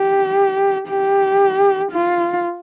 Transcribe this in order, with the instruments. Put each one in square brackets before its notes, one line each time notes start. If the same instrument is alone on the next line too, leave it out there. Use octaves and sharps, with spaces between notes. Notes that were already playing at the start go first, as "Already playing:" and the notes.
Already playing: [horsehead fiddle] G4
G4
F4